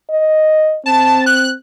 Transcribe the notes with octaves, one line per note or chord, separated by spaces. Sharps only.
D#5
C4 A5
F#6